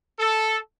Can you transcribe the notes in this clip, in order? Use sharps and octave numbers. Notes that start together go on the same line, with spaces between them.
A4